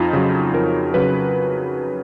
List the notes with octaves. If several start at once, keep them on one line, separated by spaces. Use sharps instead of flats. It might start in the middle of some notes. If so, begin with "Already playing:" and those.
Already playing: F2 D#4 F4
C#3 F#3
F2 A#4
C#3 F#3 B4